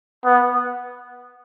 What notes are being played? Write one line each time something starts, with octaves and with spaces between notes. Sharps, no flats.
B3